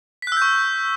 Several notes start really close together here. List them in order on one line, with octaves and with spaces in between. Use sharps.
B6 F#6 E6 G6 C#6